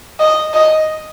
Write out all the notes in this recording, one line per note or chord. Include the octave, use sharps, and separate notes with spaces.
D#5
D#5